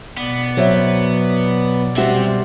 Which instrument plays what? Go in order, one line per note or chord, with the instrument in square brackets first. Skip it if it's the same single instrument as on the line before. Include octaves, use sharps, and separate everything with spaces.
[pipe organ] B2 D5 [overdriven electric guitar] B3
[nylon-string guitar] F#3 C5 E5
[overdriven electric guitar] C3 E5 [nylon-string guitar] G3 F#4 C5